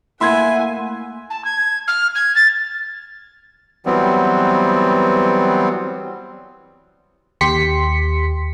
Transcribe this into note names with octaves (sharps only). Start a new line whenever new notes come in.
A3 A#3 E4 F#5 G#5 C6 G#6
A5
G#6
F6
G#6
A6
E3 F#3 G3 B3 C4
D#2 G4 C6 B6 C#7